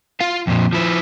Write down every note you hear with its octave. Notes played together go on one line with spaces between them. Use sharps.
F4 F5
F2 A#2
F3 E4